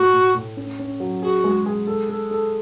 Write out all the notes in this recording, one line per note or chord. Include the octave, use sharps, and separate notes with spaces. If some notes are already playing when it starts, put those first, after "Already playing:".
Already playing: A2 F#4
A2
A2
C#4
C#4
F#3
F#4 G#4
G#3
G#4
A4
A4
A4